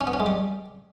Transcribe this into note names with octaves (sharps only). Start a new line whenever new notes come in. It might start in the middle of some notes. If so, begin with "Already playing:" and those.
C#4
B3
C#4
G#3
G3